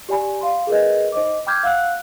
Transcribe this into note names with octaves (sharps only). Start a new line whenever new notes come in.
G4 D5 G#5 B5
F5 C6
G#4 A#4 B4 D#5
D#4 C5 D#5 D6
G5 B5 D6 F6 G6 G#6
F5 F#5 E6 F#6